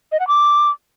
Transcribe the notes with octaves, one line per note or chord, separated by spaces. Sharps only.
D#5
F#5
D6